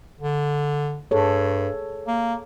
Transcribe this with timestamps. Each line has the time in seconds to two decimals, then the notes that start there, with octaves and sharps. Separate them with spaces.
0.20 D3
1.11 G2 G#4 A4 C#5
2.07 A#3